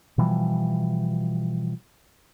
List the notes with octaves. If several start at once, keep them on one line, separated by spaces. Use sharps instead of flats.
B2 E3 F3 G3